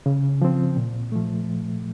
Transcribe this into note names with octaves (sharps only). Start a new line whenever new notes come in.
C#3
F3 C4
A#2
F3 A3